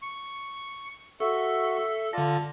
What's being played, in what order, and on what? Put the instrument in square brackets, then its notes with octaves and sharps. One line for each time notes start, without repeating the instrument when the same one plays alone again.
[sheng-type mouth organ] C#6
[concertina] F#4 C#6 [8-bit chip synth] A4 [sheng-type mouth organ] E5
[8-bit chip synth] D3 A#6 [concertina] F4 A5 [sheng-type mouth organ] D5